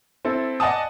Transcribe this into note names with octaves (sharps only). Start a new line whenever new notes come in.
C4 E4 A4
D5 D#5 F#5 G#5 A5 D#6